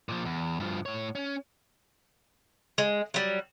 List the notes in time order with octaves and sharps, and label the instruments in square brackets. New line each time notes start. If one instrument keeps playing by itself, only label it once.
[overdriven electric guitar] A#2 F3
E2
G2 F3
A2 C#5
C#4
[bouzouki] G#3
F#3 G3